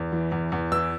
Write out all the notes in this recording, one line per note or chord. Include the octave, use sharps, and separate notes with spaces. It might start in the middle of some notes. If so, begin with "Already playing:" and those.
Already playing: E2
E3
E2
E2
E3 E6